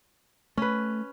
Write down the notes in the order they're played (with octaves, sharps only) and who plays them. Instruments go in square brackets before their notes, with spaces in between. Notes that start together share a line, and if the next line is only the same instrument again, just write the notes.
[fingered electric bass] A3 [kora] C#4 B4